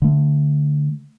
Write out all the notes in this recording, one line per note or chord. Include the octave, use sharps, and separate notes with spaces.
D3 A3